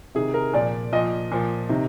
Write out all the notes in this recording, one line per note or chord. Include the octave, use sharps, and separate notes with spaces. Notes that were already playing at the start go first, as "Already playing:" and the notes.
C3 D#3 G#4
A#4
A#2 F3 D5
A#2 F3 D#5
A#2 F3
C3 D#3